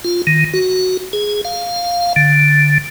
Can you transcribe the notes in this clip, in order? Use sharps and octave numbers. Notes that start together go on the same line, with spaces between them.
F4
D#3
F#4
G#4
F5
D3